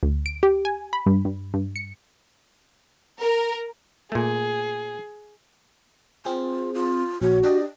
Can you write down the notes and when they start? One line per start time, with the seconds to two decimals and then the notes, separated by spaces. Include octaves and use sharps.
0.03 D2
0.26 D7
0.43 G4
0.65 G#5
0.93 B5
1.06 G2
1.25 G2
1.54 G2
1.76 C#7
3.21 A#4
4.12 A#2 A3 G#4
6.25 C4 F4 G#4
6.74 F4
7.21 A#1 F#4 C#5
7.43 D4 G4 D5 D#5